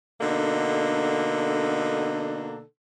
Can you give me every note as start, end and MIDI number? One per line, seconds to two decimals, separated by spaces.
0.20 2.61 47
0.20 2.61 50
0.20 2.61 58
0.20 2.61 62
0.20 2.61 63
0.20 2.61 69